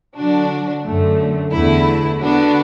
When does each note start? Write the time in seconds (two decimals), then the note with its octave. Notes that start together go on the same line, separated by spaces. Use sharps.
0.17 D3 F#3 D4 F#4
0.85 F#2 D3 A3
1.53 E2 D3 A3 E4
2.21 D3 B3 D4 F#4